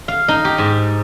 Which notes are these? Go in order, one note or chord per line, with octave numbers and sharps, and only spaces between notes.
F5
D#4
G4
G#2